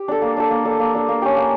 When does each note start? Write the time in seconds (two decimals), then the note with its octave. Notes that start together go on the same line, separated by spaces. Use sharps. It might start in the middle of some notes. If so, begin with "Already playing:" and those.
Already playing: G4
0.08 D4 A4
0.22 A#3
0.37 D4 A4
0.51 A#3
0.65 D4 A4
0.80 A#3
0.94 D4 A4
1.09 A#3
1.22 C#4 G4
1.37 A#3